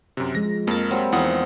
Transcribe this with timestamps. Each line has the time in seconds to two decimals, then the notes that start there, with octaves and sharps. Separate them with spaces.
0.17 F#2 C3
0.35 F3 G#3 A#6
0.67 F2 A#3 A#4 A5
0.91 F#3 G3 C4
1.12 E2 F3 D#4 F#5 D#6